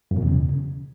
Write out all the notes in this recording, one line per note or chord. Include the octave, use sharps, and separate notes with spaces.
F#2
B2
E2
C#3